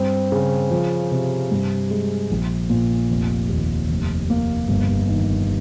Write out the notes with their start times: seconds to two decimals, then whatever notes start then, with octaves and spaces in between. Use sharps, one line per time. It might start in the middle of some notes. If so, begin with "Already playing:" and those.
Already playing: G2 C4
0.32 C#3
0.71 F3
1.11 C3
1.51 G2
1.90 G#3
2.31 A#1
2.69 A#2
3.10 F1
3.49 D#2
3.89 F1
4.30 A#3
4.68 G1
5.09 D#3